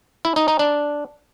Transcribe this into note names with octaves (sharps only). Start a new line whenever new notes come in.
E4
D#4
D#4
D4